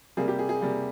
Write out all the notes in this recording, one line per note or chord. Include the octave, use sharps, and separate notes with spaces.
C3 G3 A#3 G#4
G4
G#4
G#4
C3 G3 A#3